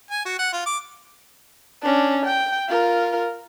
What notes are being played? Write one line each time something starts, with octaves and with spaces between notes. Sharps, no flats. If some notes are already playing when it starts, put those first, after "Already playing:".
G#5
F#4
F#5
F4
D6
C#4 D4
G5
F4 A#4